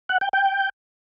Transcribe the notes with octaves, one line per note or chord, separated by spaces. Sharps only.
F#5
G5
G5